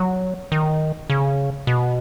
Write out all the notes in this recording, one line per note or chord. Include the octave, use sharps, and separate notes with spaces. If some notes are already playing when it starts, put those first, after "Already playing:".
Already playing: F#3
D#3
C#3
B2